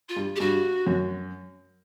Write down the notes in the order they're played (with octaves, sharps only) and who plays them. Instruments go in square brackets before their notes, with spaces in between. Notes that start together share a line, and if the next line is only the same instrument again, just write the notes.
[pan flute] F4
[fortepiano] G2
[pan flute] G4
[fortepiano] G2 [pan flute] F#4
[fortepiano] F#2